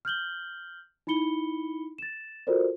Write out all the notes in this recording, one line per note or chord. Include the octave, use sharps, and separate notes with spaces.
F6 G6 F#7 G7
D#4 E4 B5 C#7 G7
A6 E7
F4 F#4 A4 A#4 C5 D5